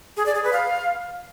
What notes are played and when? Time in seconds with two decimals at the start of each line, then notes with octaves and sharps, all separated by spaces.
0.17 G#4
0.26 D5
0.35 G#4
0.44 B4
0.53 F5